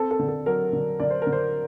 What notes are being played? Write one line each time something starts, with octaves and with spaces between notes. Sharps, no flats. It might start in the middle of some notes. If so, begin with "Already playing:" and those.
Already playing: C4 A4
A4
D3
A4
F#3 A#4
D3
D3 D5
C5
A#4
D3
C5